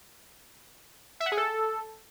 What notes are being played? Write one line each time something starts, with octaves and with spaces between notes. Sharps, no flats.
E5
F#5
G#4
A4